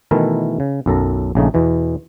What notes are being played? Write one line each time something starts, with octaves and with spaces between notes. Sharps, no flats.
B2 D#3 E3 A3 E4 A#4
C#3
B1 F#2 A4 A#5
A#1 C#3 A3 D#4
E2 B2 E3